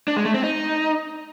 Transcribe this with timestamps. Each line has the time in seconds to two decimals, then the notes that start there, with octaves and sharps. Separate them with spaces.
0.08 D4
0.16 G#3
0.25 A3
0.34 C4
0.43 D#4